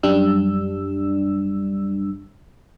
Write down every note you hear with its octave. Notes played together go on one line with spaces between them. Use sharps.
F#2 G3 D4 E6